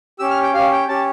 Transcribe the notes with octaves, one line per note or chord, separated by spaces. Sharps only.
C#4 G4 E6
F6
G5
C#4 G4 F5
G5
C#4 G4 A5